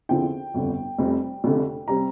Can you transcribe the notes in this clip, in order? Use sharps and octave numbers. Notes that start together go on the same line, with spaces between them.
E2 D3 F3 C4 E4 G5
G1 F2 D3
F1 F2 C3 G3 C4
F1 F2 D3 A3
C3 G3 C4 A#5